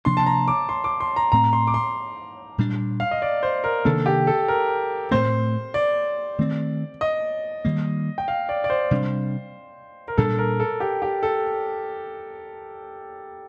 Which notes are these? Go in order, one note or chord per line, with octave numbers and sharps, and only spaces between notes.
C3 F3 A#3 D4 C6
A5
A#5
D6
C6
D6
C6
A#5
A2 A3 C4 A#5
C6
D6
C6
A#2 G3 D4
F5
D#5
D5
C5
A#4
C3 D#3 A#3 D4 A4
G4
A4
A#4
A2 A3 C4 C5
D5
D#3 A3 C4
D#5
D#3 G3 A#3
G5
F5
D5
D5
C5
C3 G3 D4
A#4
A#2 G3 D4 A4
A#4
A4
G4
G4
A4